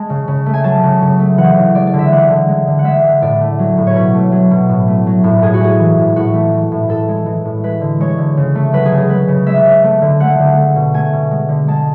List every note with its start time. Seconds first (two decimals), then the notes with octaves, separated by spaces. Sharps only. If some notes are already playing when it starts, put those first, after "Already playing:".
Already playing: G#3 A5
0.10 C#3
0.28 C#3
0.46 A3
0.53 G#5
0.64 F#3 A5
0.83 C#3
1.02 C#3
1.20 A3
1.38 E3 F#5
1.57 C#3
1.75 G#3 D5
1.87 D5
1.94 D3
1.99 E5
2.12 G#3 F#5
2.30 D3
2.48 G#3
2.67 D3
2.79 F#5
2.85 G#3 E5
3.04 D3
3.21 A2 D5
3.41 A3
3.59 F#3
3.77 A2
3.87 C#5
3.95 B2 B4
4.15 A3
4.32 F#3
4.51 B2
4.69 A2
4.88 A3
5.06 F#3
5.24 A2
5.42 A2 G#4
5.54 F#4
5.61 G#3 G#4
5.79 E3
5.98 A2
6.16 A2 F#4
6.34 A3
6.52 E3
6.72 A2
6.89 A2 A4
7.09 G#3
7.26 E3
7.45 A2
7.64 G#3 B4
7.81 D3
8.00 G#3 C#5
8.18 D3
8.37 C#3
8.55 A3
8.73 F#3 B4
8.85 G#4
8.92 C#3
8.98 G#4
9.10 G#3 B4
9.28 C#3
9.47 G#3 E5
9.65 C#3
9.84 A3
10.02 D3
10.20 A3 F#5
10.39 D3
10.57 A3
10.76 B2
10.94 A3 G#5
11.13 B2
11.31 G#3
11.49 D3
11.68 G#3 A5